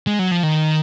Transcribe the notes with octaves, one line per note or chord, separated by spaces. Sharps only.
G#3
F#3
F3
D#3